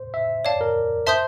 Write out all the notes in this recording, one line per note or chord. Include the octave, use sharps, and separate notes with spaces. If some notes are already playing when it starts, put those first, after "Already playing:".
Already playing: C5
E5
C#5 D5 F5 A5
A#4
C5 E5 A5 C6 D#6 G6